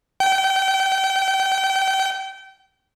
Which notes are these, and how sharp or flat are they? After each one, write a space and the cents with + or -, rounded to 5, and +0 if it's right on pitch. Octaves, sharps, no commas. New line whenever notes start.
G5 -30